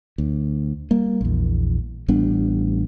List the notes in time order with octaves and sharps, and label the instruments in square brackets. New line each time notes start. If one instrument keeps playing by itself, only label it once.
[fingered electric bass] D2
G3 A#3
A#1 E2
A1 G3 B3 D4